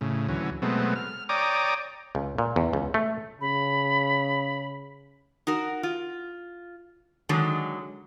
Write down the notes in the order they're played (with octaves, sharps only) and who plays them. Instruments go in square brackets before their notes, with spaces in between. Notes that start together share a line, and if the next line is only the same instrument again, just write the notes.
[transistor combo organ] A2 C#3
D2 E3 F#3 C#4
B2 F#3 G#3 A3 B3 C4
F6
C#5 D5 G5 A#5 D6 D#6
[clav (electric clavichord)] C#2
A#2
E2
C#2
A3
[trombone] C#3 [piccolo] B5
[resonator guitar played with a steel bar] D#4 F#4 A#4
F4
D3 D#3 F#3 G#3